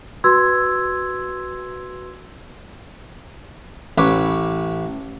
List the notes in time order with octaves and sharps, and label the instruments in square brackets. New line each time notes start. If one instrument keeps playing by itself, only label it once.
[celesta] F#4 B4 C6 E6 G#6
[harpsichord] A1 B4 C#5 D6